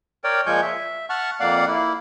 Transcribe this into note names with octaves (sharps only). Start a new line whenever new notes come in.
A#4 C#5 D5 G5
A#2 F3 G#3 G#5 C#6 G6
E5
F#5 A5 C#6 F6
F2 A#3 D5 F5 F#5
A#3 E4